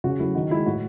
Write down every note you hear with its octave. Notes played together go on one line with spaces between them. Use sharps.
C#3 F#4
F#3 A3 E4
D#3 F#4
G#3 E4
A2 F#4